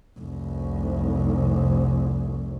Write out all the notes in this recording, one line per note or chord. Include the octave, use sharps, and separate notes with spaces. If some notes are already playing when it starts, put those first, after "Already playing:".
F1 C2